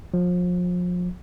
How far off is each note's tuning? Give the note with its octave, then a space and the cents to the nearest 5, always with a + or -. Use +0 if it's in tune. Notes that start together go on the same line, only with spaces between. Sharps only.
F3 +35